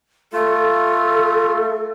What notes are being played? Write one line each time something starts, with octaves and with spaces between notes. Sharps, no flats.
A3 F4 A4